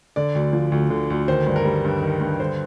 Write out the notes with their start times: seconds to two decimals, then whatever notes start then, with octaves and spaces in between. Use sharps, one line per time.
0.16 D3 D5
0.35 D2
0.53 F3
0.72 D2
0.90 D3
1.10 D2
1.28 D#3 C5
1.47 G2
1.56 A#4
1.65 G3
1.84 G2
2.02 D#3
2.21 G2
2.40 D3 C5